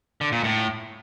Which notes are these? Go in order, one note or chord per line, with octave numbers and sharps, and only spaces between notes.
D3
A#2
A2